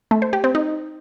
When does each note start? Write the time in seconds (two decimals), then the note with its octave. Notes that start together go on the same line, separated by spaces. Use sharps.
0.11 A3
0.22 C5
0.33 G4
0.44 C4
0.55 D#4